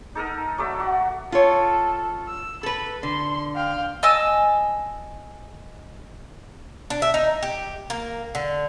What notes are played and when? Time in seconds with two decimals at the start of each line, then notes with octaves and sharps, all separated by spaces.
0.15 D#4 A4 A#4 D#5
0.58 F#3 A3 D5 E5
0.80 F#4 F#5
1.32 F4 A4 C#5
2.27 E6
2.63 A4 B4 B5
3.03 D3 C6
3.56 F5 G5
4.03 D#5 G#5 A5 E6
6.90 D4
7.02 E5
7.14 D#4
7.43 G4
7.90 A#3
8.35 D3